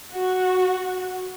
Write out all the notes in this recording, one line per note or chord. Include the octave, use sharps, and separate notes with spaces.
F#4